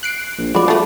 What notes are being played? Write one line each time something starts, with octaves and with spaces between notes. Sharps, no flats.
F#6 C7 D7
A#1
F3 G#3 F#4 D5 B5 D6
F#3 A3 A5